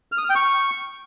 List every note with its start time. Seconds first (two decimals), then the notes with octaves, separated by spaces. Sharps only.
0.12 F6
0.18 D#6
0.24 F6
0.30 G5
0.36 C#6